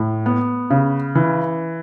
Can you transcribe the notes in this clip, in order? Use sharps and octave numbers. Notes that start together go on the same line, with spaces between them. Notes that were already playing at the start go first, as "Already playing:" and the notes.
Already playing: A2
B3
C#3
E3